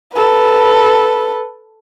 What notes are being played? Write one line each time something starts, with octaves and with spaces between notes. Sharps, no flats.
A4 B4